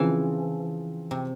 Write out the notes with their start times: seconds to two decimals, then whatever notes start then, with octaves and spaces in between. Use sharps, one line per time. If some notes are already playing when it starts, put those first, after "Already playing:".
Already playing: C#3 E3 F3 C4 F4
1.11 C3